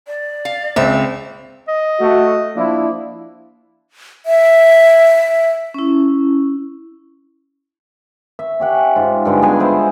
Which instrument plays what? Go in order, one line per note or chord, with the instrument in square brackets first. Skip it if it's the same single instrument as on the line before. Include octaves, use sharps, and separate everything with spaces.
[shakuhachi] D5
[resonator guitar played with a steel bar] F5
[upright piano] C#2 C4 [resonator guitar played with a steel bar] E5
[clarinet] D#5
[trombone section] A3 F#4
[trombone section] F3 D4 E4 [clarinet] A#3
[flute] E5
[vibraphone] C#4 E4
[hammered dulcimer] E5
C#4 G4 F#5
G#2 F4
G2 D3 G#3
B3 G#4 B4 G#5
E4 C5 G#5 C6